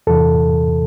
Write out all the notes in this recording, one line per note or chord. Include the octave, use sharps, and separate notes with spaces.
E2 C3 E3 A4